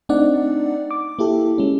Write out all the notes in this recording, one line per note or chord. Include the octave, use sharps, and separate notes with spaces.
A3 C4 D4 D#4 D5 F#5
D6
A#3 E4 G4 A4
G#3 C#4